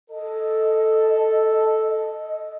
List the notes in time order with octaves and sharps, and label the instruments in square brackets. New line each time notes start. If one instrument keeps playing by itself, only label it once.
[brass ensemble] A4 [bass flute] D#5